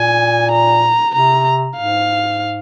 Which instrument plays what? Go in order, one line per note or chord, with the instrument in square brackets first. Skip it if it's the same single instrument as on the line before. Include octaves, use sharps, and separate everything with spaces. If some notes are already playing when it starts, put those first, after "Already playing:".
Already playing: [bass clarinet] A#2 [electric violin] G#5
[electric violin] A#5
[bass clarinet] C3 [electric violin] A#5
[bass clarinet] G#2 [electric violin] F5